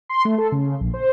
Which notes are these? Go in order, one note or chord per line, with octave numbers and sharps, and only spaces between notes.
C6
A3
A4
C#3
A#1
C5